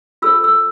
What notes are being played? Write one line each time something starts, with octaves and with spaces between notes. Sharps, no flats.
F4 A4 C5 E6
E6